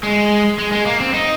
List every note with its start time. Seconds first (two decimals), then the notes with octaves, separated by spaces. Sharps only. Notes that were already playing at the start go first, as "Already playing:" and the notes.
0.03 G#3
0.59 G#3
0.73 G#3
0.86 A#3
1.00 C4
1.14 D#4